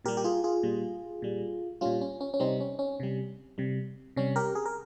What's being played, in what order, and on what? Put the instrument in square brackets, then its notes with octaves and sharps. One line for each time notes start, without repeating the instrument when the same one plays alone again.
[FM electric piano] A#2 G3 G4 A#4
G4
F4 G#4
F4 G#4
A#2 G3
A#2 G3
A#2 G3 C#4 F4
C#4
C#4
C#4
C3 G3 C4 D#4
C#4
C#4
C3 G3
C3 G3
C3 G3 C#4
G4 A#4
G#4
A#4